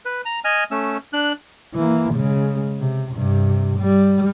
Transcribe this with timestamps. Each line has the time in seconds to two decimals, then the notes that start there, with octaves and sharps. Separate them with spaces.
0.05 B4
0.25 A#5
0.44 D#5 G#5 F6
0.71 A3 C#4 E6
1.13 D4 F#6
1.74 E3 A#3
2.14 C#3 G#3
2.79 C3
3.15 G2 C3
3.79 G3